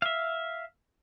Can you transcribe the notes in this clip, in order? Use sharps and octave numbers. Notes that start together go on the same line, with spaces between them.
E5 F5